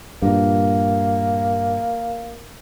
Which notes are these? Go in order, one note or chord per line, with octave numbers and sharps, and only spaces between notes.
G2 A#2 A#3